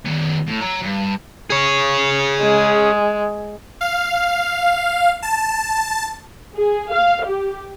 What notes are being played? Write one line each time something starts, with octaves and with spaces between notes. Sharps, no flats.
D#3 B3
A2
C#5 A#5
G2
G#4 C#5
G#3
F5
A5
G#4
F5
G4